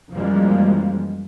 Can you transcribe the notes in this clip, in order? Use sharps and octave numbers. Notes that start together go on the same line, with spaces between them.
F#2 E3 F3 G3 G#3 A#3